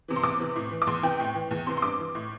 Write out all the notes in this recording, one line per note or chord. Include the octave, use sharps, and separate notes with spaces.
C3 E3
C6
E2 D6
C3 E3
A2
E3
D6
E2 C6
C3 E3 G5
A2
E3
E2
C3 E3 C6
C6
G2 D6
E3
A2